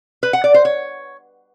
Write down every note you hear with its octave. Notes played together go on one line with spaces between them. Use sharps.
B4
F#5
D5
C5
C#5